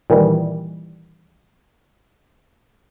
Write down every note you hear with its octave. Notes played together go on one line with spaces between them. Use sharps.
A#2 D#3 E3 G3